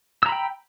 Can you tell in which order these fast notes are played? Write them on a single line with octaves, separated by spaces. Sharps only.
E6 A#5 B5 G5